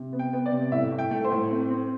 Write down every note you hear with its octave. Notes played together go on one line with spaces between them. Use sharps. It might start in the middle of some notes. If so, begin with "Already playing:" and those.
Already playing: C3
B3
G5
B3
D5
C3
A2 E5
A2
G5
A3
C5
A2
C4
C4